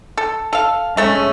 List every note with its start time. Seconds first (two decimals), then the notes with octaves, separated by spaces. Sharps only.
0.17 A4
0.53 A4 F5
0.97 G#3 A3 C#4 A4 E5